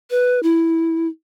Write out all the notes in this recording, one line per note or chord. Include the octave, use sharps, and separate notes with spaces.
B4
E4